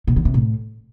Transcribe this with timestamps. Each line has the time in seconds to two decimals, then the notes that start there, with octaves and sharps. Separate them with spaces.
0.07 B2
0.16 D3
0.25 C3
0.34 A2